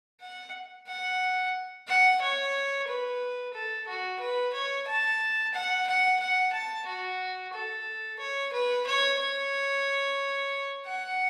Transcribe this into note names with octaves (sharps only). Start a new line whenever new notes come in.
F#5
F#5
F#5
C#5
B4
A4
F#4
B4
C#5
A5
F#5
F#5
F#5
A5
F#4
A4
C#5
B4
C#5
C#5
F#5